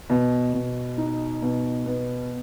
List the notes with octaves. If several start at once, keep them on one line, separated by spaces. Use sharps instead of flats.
B2
B2
D#4
B2
B3